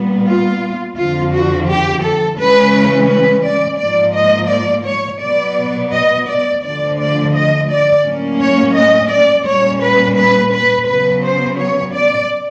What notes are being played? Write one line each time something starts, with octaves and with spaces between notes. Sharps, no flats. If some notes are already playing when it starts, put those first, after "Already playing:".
Already playing: A#2 G3 B3
F4
F2 D3 F3 F4
F#4
G4
A4
C#3 E3 G#3 C#4 B4
B4
D5
G#2 F3 A#3 D5
D#5
D5
C#5
B2 F#3 B3 D5
D#5
D5
D2 D3 F3 D5
D5
D#5
D5
A2 F#3 A#3 C#4
C#5
D#5
D5
A#2 G3 A#3 C#4 C#5
B4
B4
B4
C#3 F#3 B3 B4
C5
C#5
D5